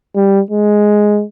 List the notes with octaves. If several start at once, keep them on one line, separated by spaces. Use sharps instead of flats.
G3
G#3